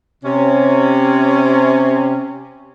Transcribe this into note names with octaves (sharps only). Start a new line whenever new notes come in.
C3 C#4